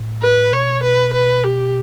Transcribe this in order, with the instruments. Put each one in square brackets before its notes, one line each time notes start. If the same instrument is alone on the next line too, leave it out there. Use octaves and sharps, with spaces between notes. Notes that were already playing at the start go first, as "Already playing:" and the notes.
Already playing: [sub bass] A2
[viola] B4
[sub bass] B2 [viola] C#5
[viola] B4
B4
G4